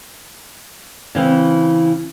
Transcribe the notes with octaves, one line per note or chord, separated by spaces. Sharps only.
C#3 E3 C4